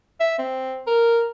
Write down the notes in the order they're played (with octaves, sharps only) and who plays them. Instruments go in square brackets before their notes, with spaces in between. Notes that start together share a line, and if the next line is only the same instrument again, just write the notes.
[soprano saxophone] E5
C4
A#4